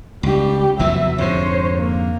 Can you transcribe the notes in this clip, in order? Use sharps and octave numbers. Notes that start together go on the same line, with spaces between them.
C#2 G3 G4
F1 E2 E3 F#3 E5
F2 G#2 D3 C5 C#5
A#3